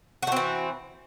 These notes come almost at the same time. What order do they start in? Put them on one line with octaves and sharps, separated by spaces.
F#4 A3 C4 E3